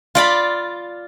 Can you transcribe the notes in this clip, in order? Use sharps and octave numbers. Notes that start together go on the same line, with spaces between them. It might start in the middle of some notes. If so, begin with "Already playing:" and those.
F4 D5 B5